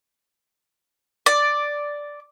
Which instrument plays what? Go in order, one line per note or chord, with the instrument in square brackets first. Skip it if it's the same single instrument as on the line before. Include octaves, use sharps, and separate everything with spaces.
[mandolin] D5